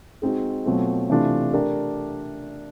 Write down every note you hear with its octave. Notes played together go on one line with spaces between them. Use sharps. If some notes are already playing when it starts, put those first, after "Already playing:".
G#3 C4 D#4 F#4
B2 F#3 A3 C4 F4
C3 E3 A3 D4 F4
A3 D4 G4 A#4 D5